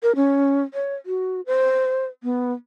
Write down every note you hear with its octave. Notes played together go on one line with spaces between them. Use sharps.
A#4
C#4
C#5
F#4
C5
B3